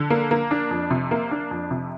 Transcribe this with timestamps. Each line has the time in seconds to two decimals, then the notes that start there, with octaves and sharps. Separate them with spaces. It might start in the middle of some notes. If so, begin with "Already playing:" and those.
Already playing: D3
0.10 A#3
0.31 A#3
0.51 D4
0.71 F2
0.90 C3
1.11 A#3
1.31 D4
1.51 F2
1.71 C3